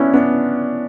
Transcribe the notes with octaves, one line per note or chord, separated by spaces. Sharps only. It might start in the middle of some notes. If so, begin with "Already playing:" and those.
Already playing: B3 C#4 D4 E4
B3 D4